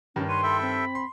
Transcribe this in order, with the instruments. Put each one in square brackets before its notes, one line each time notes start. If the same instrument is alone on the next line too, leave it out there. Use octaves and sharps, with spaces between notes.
[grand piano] G2 D#3 [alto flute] C#4
[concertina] B4 C#5 [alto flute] C6 [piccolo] D#7
[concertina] A4 E5 G5 [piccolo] B5
[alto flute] C4
[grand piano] C6